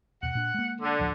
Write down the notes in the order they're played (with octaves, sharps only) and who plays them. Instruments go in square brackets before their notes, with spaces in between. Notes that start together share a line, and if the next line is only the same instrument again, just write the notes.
[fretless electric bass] D#2 B2 [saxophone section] F#5
[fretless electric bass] A#2 D4
G#3 A#3
[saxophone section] D3
[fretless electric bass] A1 D2 F3